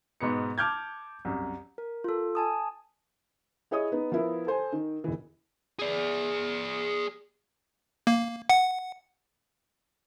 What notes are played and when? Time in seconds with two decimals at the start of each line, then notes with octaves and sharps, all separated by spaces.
0.21 G#2 B2 B3 C#7
0.58 A5 D6 F6 G6 G#6
1.25 C2 F#2
1.78 A#4
2.04 F4 A4
2.35 G#5 A5 D#6
3.71 E4 G#4 C#5 D#5 D#6
3.92 B3 D#4
4.12 F3 B3 E4 A#4
4.47 A4 C5 G#5
4.72 D#3
5.04 E1 E3
5.79 G#4 D5
8.07 A#3
8.49 F#5